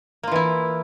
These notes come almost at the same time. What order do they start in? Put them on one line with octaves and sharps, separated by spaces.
A#3 F4 E3 E4